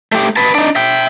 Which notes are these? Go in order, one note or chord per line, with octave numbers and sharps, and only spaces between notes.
A3 G4
B4 A5
D4 D#4
E5 G5